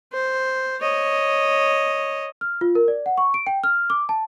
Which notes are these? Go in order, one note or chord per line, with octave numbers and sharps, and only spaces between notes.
C5
C#5 D#5
F6
F4
A#4
D5
F#5
C#6
D7
G5
F6
D6
A5